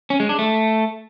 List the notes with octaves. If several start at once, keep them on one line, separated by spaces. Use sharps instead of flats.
C#4
G#3
D4
A3